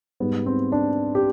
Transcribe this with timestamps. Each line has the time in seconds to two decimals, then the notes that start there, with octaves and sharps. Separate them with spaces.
0.20 G#2 G3 B3
0.46 C4
0.72 D4
1.15 G4